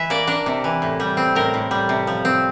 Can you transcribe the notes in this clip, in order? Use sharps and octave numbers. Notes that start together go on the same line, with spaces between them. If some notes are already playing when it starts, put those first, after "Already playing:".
Already playing: E3 E5
A#3 D5
D4 A#4
C3
E3
A2
G3
C4
A2 A#4
A2
G3
C3
F3
C4